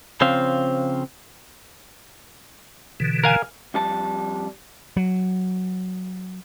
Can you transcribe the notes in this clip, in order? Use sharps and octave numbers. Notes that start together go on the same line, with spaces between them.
C#3 F3 C4 F5
B2 D3 E3
A#4 F5 G#5
F2 G3 A5
F#3